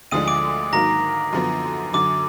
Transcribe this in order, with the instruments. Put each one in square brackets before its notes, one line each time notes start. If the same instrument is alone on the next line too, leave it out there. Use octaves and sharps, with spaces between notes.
[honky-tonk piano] D2 D3 F3 G#3 D4 [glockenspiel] D#6 D#7
[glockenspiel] D6 D7
[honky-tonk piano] G#2 D#3 F#3 A#3 [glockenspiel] A#5 A#6
[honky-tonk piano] F#2 D3 F3 B3
[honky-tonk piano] F#2 D3 F#3 [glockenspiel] D6